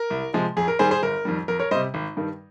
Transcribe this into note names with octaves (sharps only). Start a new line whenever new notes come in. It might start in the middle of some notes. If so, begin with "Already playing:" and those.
Already playing: A#4
C2
C3 F3 G#3
F2 G#4
A#4
D#3 G3 G#4 C5
G#4 C5
G1 A#4
F2 D#3 G3
F2 A#4
A#4 C#5
C3 G3 C5 D#5
G#1
G2 D#3 G3